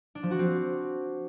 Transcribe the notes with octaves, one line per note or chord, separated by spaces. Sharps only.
D4
F3
F#4
C4